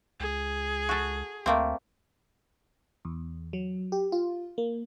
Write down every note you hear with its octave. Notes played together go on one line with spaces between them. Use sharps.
C#2 G#4
F#4 A4
D2 A3 A#3 C4
E2
F#3
G4
F4
A#3